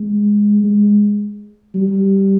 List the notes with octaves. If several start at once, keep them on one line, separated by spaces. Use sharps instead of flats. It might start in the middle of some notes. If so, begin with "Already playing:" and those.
Already playing: G#3
G#3
G3